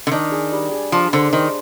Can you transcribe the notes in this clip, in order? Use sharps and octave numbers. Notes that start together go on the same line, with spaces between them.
D3
D#3 D4
G#4
G3
G#4
F3 D4
D3 C5
D#3 C5